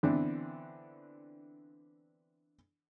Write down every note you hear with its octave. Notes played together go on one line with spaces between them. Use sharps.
D3 E3 B3 C4 D4 B4